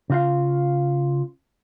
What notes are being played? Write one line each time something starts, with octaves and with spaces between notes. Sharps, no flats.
C#3 F4 F5